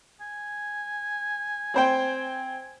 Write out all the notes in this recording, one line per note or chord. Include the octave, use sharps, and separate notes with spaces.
G#5
C4 C5 G5